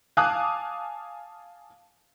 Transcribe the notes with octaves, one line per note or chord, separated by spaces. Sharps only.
F5 G#5 A5 D6 D#6 F#6